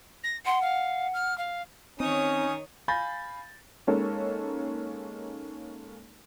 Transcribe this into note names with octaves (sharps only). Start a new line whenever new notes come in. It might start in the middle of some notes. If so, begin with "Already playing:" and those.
A#6
F#5 C6
F5
F6
F5
D#3 C4 C#4 D#4 C#5 D#6
F5 G#5 B5 G6 A6 A#6
G#3 A#3 C#4 D#4 A4 A#4